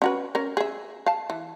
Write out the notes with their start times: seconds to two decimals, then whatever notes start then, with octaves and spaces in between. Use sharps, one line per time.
0.02 C#4 F#4 B4
0.35 C#4 A#4
0.57 G#4 E5
1.06 F5 A5
1.30 E3